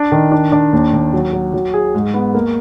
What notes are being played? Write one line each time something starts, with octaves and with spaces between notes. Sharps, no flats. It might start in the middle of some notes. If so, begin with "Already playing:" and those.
Already playing: D4
D#3
D4
D4
D#2
D#2
F#3
F#3
F#3
G#4
G#2
B3
A#3